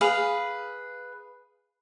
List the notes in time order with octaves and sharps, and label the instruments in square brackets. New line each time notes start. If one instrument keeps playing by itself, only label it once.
[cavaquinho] G#4 B4 F5